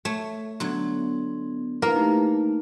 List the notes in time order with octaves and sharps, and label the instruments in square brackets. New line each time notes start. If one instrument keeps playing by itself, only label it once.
[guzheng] A3 [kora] C#5
[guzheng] D3 F#3 [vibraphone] B3 [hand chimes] C6 G#6
[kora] A#3 [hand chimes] D4 E4 B4 [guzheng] A#4
[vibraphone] A3 G4 [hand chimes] D#4